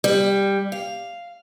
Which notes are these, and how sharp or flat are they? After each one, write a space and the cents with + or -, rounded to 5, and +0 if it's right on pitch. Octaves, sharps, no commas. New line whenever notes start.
G3 +10
F5 -5